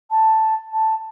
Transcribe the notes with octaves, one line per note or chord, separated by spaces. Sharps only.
A5
A5